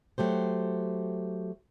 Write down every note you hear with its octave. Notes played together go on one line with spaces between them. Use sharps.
F#3 A3 G4 C5